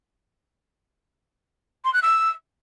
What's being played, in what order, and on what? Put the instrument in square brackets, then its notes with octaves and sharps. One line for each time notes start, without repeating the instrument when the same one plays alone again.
[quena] C6
F#6
E6